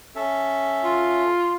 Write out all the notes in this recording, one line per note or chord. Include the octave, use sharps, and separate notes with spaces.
C#4 A4 E5
F4